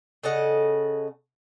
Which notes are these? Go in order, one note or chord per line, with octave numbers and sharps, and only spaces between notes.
C#3 A4 D#5 F#5